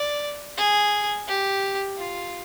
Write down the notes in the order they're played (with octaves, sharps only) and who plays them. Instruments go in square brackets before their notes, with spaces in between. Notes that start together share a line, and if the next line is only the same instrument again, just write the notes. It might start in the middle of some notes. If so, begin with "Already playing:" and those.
Already playing: [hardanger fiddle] D5
G#4
G4
F4